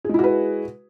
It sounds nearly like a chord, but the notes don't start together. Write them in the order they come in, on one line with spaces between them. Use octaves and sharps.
G#4 G#3 E4 F#4 B4